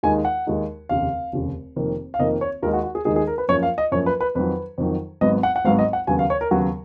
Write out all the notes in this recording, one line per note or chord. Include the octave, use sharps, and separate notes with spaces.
D#2 D#3 G#3 D#4 G#5
F#5
D#2 D#3 G#3 D#4
F1 D#2 C#3 F5
F1 D#2 C#3
F1 F2 D#3 A#3
F5
F1 F2 D#3 A#3 D#5
C#5
D#2 D#3 G#3 D#4 A#4
F#4
F#4
G#4
D#2 D#3 G#3 D#4 G#4
G#4
A#4
B4
F#2 F3 A#3 C#5
F5
D#5
F#2 F3 A#3 C#5
B4
B4
F2 D#3 F#3 B4
F2 D#3 F#3
G#1 G#2 F#3 B3 D#5
F#5
F#5
G#1 G#2 F#3 B3 F5
D#5
F#5
D#2 C#3 F#3 B3 G#5
F5
C#5
A#4
D#2 C#3 F#3 B3 F#4